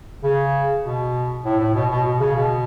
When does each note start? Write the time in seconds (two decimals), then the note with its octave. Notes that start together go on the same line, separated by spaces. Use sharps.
0.24 C#3
0.84 B2
1.45 A2
1.60 A2
1.75 B2
1.91 B2
2.05 B2
2.20 C#3
2.36 B2